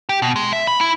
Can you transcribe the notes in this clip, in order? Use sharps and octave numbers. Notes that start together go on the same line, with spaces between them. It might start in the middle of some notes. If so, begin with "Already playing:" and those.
G4
B2
G#3
E5
B5
E4